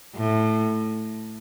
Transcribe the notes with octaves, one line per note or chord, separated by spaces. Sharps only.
A2